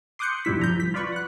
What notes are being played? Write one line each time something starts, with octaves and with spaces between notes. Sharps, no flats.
C6 D6 D#6 F#6 G6 C#7
G2 B2 G3 E4 B6
F3 A#5 G6
C2 B6
F4 B4 D5 B5 C#6
F#5 F#6